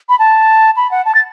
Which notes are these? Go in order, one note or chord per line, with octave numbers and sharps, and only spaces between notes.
B5
A5
B5
F#5
A5
A6